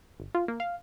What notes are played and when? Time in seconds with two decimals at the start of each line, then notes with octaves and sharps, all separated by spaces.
0.20 G1
0.35 F4
0.48 A#3
0.60 F5